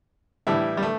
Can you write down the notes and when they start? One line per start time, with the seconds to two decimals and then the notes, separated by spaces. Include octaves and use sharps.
0.47 A2 E3 G3 E4
0.77 G3
0.83 A3